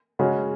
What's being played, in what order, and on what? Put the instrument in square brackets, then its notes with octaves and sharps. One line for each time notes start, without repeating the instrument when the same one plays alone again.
[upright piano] C#3 G#3 C#4 F#4